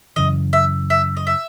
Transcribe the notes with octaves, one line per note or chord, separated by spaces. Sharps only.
F#2 C#3 E3 D#5
E5
E5
D#5
E5